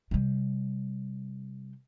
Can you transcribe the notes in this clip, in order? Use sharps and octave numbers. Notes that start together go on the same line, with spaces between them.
C3 G3